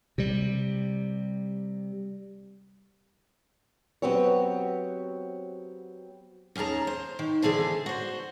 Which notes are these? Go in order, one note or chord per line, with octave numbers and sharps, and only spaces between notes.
C3 G3
F#3 B3 C4 G4 C#5
D#2 C#4 G#4 A5 A#5
C5
D#3
D3 E3 G#4 A4 C5
F#4 C5